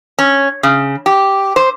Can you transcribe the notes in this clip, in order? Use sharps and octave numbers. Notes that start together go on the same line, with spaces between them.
C#4
C#3
G4
C5